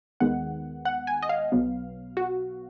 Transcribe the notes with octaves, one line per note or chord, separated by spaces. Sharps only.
D#2 D#3 G#3 B3 F#5
F#5
G#5
D#5
F5
B1 B2 F#3 B3
F#4